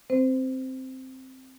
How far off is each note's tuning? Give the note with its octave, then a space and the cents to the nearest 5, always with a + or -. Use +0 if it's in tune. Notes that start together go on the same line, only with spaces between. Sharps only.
C4 +0 C5 -20